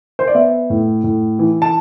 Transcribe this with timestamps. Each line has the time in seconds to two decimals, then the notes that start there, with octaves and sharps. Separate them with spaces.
0.19 C5
0.27 D5
0.35 B3 E5
0.70 A2
1.04 A2
1.39 E3
1.62 A5